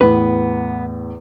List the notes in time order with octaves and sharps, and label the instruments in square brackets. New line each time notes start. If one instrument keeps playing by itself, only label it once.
[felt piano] E2 A2 [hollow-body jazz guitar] B3 B4